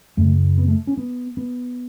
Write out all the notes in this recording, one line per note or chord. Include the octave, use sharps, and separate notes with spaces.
F#2 C#3 A3
B3
A3
C#4
B3
B3